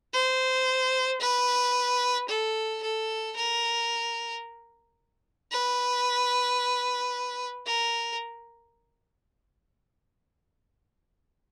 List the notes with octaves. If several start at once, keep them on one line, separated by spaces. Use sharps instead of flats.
C5
B4
A4
A4
A#4
B4
A#4